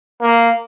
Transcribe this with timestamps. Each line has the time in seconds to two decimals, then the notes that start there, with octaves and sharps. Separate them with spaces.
0.21 A#3